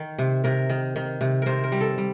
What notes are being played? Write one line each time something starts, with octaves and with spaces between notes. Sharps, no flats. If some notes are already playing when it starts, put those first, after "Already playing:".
Already playing: D#3
C3
C3 A#4
D#3
D#3
C3
C3 A#4 C5
A#4
G3
A4
G3